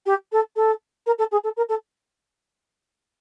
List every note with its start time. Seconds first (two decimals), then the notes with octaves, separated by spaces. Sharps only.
0.06 G4
0.32 A4
0.56 A4
1.06 A#4
1.18 A4
1.31 G#4
1.44 A4
1.56 A#4
1.69 A4